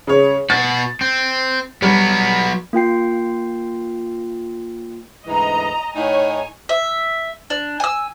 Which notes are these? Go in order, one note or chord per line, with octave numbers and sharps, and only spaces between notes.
C#3 C#5
B2 F#4 A6
C4
F#3 G3 B3
A#3 F4 G5 C7
D2 G#2 E3 D#5 A#5
A2 D#4 C#5 G#5
E5
D4
G#5 E6